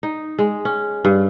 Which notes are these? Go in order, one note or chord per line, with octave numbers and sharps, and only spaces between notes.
D#4
G#3
C#4
G2